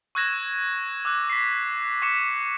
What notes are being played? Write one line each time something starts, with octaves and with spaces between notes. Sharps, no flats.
C#6 E6 F#6 G#6 A#6 E7
D6 E6 F#6
B6 C7
C#6 D6 B6 C#7 E7